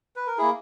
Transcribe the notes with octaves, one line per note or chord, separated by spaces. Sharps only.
B4
A#4
A#3 E4 G#4